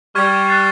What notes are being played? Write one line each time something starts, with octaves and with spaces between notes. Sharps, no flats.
G3 C#6 F6 G#6
F#6 A6 C7